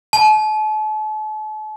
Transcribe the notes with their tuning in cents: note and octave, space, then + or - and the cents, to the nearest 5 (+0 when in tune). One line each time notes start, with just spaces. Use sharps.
A5 -40